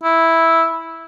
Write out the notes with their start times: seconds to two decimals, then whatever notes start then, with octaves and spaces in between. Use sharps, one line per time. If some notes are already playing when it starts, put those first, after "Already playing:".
0.03 E4